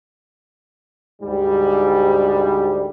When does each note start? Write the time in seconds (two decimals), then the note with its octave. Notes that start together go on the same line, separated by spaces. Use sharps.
1.22 D2 G#2 G3